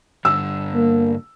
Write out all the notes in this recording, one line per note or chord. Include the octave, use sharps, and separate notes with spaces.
G2 D3 E6
A#3